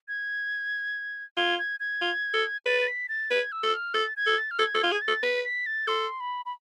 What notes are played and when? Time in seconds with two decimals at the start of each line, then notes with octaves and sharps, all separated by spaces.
0.08 G#6
1.37 F4 G#6
1.59 G#6
1.80 G#6
2.01 F4
2.34 A4
2.66 B4 A6
2.82 A6
2.87 B6
3.09 A6
3.30 B4 G#6
3.52 E6
3.63 A4
3.74 F6
3.94 A4 A6
4.17 G#6
4.27 A4
4.38 A6
4.51 F6
4.59 A4 G#6
4.75 A4
4.81 F4 G#6
4.92 G#4 G#6
5.02 A6
5.08 A4
5.23 B4 B6
5.44 B6
5.66 A6
5.88 A4 C6
6.20 B5
6.46 B5